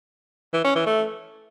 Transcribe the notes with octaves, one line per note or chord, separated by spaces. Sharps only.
E3
C#4
E3
A3